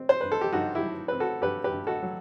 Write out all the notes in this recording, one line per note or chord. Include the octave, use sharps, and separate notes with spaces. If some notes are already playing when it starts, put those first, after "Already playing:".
Already playing: C4
C5
G2 B4
A4
G4
G2 D#4 F#4
E4 G4
F#3
C4 B4
F#4 A4
G2 G4 B4
G4 B4
G2
F#4 A4
F#3